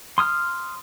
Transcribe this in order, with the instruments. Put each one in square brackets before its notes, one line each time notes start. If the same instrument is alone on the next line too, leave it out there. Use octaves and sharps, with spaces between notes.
[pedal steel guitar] C6 D#6 F6